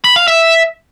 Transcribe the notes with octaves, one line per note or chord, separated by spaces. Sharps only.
B5
F5
E5